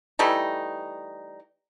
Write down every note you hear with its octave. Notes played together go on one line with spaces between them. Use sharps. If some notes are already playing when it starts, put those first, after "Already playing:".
E3 G3 A3 D#4